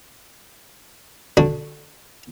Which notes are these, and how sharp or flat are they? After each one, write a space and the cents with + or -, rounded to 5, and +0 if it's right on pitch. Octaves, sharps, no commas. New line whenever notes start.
D3 +0 D4 +0 F#4 -15